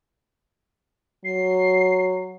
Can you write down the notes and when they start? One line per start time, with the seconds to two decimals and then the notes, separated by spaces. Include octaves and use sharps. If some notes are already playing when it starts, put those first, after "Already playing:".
1.25 F#3 C7